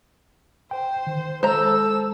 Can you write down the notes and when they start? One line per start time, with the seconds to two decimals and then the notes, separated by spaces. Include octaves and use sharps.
0.71 C5 G5
1.07 D#3
1.43 G#3 A4 C5 A#5 E6